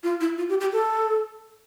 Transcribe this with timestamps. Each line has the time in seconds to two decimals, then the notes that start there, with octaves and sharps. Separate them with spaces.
0.03 F4
0.21 E4
0.38 F4
0.49 G4
0.60 G4
0.72 A4